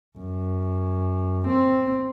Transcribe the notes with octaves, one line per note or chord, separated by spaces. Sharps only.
F#2
C4